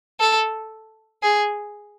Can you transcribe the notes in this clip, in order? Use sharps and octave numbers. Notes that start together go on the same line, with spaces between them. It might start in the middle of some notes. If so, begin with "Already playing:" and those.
A4
G#4